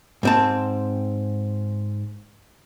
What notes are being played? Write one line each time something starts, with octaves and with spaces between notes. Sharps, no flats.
G#2 C4 A5